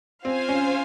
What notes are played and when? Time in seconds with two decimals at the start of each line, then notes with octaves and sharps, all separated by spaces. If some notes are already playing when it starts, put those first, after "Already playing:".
0.25 C4 F4 C5 F5 G#5
0.49 C#4